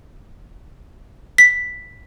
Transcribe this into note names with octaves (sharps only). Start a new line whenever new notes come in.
B6